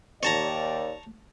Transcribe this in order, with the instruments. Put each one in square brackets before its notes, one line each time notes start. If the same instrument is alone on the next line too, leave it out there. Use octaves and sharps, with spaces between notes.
[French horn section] D#2 D5 [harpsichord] C#5 A5 A#5